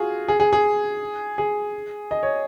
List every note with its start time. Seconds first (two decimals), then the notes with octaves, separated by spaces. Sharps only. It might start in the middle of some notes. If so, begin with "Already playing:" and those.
Already playing: F4 F#4 G#4
0.28 G#4
0.40 G#4
0.53 G#4
1.38 G#4
2.11 D#5
2.23 C#5